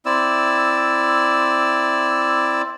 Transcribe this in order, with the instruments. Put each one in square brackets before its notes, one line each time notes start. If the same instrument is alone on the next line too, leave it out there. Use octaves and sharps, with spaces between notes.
[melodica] C4 E4 D5 E6